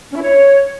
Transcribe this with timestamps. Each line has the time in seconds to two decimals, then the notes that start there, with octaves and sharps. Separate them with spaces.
0.11 C#4
0.16 E4
0.21 C#5